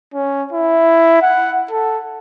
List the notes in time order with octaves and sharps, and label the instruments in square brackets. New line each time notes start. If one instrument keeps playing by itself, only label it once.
[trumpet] C#4
E4
F#5
A4